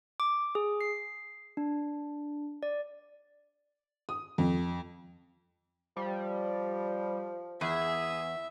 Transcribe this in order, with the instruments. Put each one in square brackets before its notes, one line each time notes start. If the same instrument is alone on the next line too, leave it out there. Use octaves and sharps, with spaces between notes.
[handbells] D6
G#4
C7
D4
D5
[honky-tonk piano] D#6
F2
[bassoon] F3 [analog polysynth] G3
[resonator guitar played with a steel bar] E2 [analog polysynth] G#4 [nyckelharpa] E5